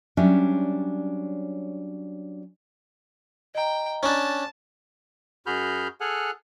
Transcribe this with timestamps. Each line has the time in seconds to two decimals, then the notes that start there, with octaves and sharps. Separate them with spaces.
0.17 F#3 G3 C#4 D4 C#5 E5
3.55 D#5 G5 A#5
4.03 C#4 D4 A5
5.46 F#2 F#4 G#4 B5 F6 G6
6.01 G#4 A4 F#5 G#5 F6 F#6